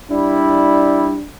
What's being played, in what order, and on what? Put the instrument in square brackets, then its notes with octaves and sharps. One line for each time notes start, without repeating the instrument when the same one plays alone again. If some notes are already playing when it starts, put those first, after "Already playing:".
[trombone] G3 [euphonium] D4 [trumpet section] E4